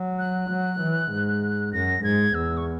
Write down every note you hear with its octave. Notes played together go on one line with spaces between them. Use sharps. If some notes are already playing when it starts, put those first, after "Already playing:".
Already playing: F#3
F#6
F#3
E3
G#2
F#2 A#6
G#2 G#6
E2 E6
C#6